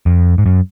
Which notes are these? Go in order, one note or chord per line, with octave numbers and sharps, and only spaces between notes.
F2
G#2
F#2